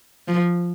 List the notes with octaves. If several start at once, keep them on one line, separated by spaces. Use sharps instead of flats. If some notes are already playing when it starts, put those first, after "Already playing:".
F3